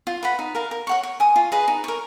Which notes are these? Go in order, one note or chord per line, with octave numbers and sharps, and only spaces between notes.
F4
B4 F#5 B5
D#4
A#4 F5 A#5
A#4
C#5 F#5 C#6
C#5
G#5 D#6
F4
G#4 B4 D#5
D#4
A#4 C#5